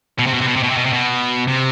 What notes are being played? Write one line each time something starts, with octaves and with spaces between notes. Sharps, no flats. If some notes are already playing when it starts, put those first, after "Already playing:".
B2
C3
B2
C3
B2
C3
B2
C3
B2
C3
B2
C3